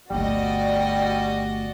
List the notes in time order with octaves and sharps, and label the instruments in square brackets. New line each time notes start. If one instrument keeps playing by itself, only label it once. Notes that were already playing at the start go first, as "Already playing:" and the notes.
[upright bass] G1 D2 [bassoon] G3 [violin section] F#4 D5 D#5